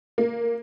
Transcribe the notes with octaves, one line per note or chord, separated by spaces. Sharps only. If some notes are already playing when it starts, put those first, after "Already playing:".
A#3